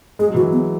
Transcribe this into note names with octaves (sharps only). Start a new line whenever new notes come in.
G#3 G#4
F#3
E3 F#4
F#3
B3